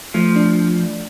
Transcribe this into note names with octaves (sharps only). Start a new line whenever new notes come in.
F3 A3
D4